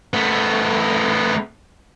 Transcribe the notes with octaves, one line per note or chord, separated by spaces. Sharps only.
A3 B3